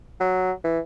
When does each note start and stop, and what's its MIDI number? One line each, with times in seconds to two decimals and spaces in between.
0.20 0.52 54
0.64 0.79 52